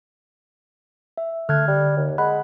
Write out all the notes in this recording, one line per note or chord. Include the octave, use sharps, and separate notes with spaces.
E5
D3 A3 F6 F#6 G#6
G3
D#2
G#3 F#5 B5 F#6